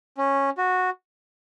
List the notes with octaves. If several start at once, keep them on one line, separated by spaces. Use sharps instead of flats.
C#4
F#4